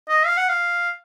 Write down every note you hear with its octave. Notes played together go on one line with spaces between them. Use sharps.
D#5
F5
F#5
F5